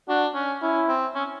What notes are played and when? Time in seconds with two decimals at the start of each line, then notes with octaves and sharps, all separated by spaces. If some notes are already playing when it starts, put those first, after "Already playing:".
0.08 D4 F#4
0.34 C#4
0.62 C#4 E4
0.88 C4
1.15 C#4